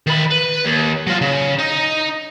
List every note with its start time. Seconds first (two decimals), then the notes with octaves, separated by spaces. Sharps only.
0.07 D#3 B5
0.30 B4
0.65 D#2
1.07 F#3 F4
1.21 C#3
1.59 D#4